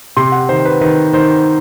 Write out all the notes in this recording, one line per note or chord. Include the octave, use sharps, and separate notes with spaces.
C3 C6
F#5
D#3 C5
B4
D#3 B4
D#3 C5